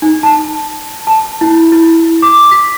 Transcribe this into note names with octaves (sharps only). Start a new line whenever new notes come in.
D#4
A5
A5
E4
E4
D6
B6